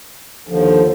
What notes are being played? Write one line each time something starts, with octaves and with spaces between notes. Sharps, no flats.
D#2 D3 F3